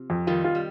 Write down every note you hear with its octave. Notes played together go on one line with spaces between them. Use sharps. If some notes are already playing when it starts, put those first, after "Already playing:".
Already playing: C3 F3
F2
D#3 G3 F4
F4
G3